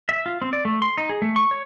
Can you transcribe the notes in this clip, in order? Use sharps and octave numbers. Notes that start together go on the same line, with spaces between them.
E5
F4
C4
D5
A3
C6
D#4
G#4
A3
C#6
C#5